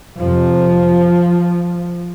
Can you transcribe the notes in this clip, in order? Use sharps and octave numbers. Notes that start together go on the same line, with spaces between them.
F2 C3 F3